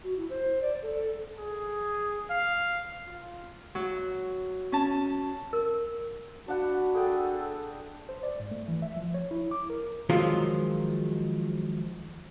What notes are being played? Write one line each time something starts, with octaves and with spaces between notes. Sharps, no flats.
F#4
E4
C5
D5
A4
G#4
F5
F4
F#3
C#4 A5
A#4
D4 F#4 F#5 B5
G#4 A4 G5
C5
D5
G#2
A3
E3
E5
F3
C#5
E4
D6
A#4
D#3 F3 F#3 G#3 F4